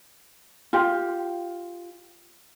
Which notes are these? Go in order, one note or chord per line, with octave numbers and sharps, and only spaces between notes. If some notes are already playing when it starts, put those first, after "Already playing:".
F4 G4